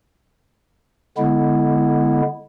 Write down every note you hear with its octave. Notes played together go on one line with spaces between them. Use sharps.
D3 G#3 B3 E4